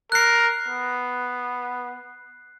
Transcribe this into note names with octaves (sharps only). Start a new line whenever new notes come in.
A#4 F#6 C7
B3